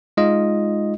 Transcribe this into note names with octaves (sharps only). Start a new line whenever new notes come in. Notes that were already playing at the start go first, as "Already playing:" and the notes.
G#3 D#4 F4 D#5